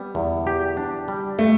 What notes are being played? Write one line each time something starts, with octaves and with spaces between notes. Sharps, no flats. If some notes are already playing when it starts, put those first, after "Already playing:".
Already playing: G3 B3
E2
G4
D4
G3
A3